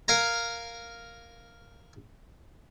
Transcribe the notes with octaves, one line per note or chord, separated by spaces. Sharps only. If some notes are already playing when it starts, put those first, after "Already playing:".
A#4 F5 G#5 A#5